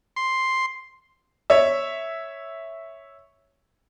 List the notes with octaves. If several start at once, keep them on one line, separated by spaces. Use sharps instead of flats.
C6
C#5 E5